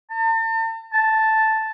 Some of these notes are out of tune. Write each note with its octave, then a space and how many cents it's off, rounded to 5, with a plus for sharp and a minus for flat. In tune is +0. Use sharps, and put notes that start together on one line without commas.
A5 +45
A5 +0